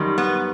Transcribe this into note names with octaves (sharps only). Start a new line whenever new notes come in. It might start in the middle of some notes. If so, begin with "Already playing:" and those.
Already playing: F#2 D#3 G3
B3